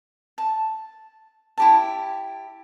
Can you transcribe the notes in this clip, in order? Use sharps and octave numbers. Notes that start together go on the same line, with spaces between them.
A5
E4 G4 A5